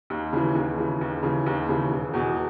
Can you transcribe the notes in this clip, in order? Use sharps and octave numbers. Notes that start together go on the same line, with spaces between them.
D#2
C#3 E3
D#2
C#3 E3
D#2
C#3 E3
D#2
C#3 E3
E1
E2 B2